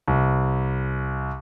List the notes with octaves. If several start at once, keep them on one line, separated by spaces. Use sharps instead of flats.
C2